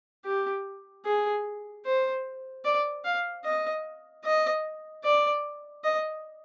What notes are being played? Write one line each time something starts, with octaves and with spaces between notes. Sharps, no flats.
G4
G#4
C5
D5
F5
D#5
D#5
D5
D#5